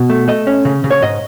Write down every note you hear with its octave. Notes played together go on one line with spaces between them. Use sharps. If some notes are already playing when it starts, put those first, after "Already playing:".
Already playing: B2
A3
A3 D#5
C#4
C#3
C#3
C#5
G#2 D#5